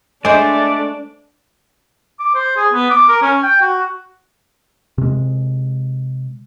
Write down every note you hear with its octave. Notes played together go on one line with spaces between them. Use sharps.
G#3 A3 D4 C5 D5
D6
C5
G#4
B3
D6
A#4
C#4
G5
F#4
C3 G#3